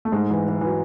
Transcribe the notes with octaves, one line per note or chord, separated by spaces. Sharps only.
A3
G#2 G#3
E3
E3
E3
F#3